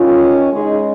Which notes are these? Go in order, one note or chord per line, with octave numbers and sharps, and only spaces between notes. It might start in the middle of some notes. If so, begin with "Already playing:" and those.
Already playing: D#3 C#4 F4
C#3 G#3 D#4 G#4